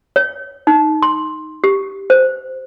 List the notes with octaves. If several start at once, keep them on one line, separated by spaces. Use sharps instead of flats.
C#5
D#4
C6
G4
C5